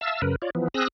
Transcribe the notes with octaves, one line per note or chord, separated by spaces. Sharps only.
E5 F5 A5 E6
F#2 C#3 A#4 B4
F4 C#5 D5
E3 F3 B3
C4 G#4 D#6 E6 F#6 A#6